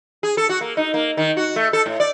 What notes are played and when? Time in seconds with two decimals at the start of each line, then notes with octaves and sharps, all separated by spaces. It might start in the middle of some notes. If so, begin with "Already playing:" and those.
0.23 G#4
0.37 A4
0.49 F#4
0.61 A#3
0.77 D#4
0.94 A#3
1.17 D#3
1.37 F#4
1.56 A3
1.73 A4
1.86 A2
2.00 D5